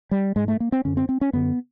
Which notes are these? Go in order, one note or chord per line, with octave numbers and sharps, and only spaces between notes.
G3
G#2 G#3
A3
A#3
C4
F#2 D3 C#4
C4
C4
C#4
F#2 D3 B3